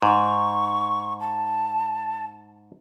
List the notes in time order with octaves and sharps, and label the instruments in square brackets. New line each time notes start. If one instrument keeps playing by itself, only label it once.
[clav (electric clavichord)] G#2 [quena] C#6
[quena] A5